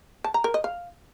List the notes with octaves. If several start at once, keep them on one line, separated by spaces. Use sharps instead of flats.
A5
A#5
A#4
D#5
F5